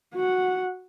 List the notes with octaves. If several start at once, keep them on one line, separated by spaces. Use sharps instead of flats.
F#4 F#5